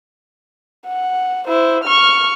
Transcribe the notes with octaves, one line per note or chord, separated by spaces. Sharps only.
F#5
E4 C5
C#6 F6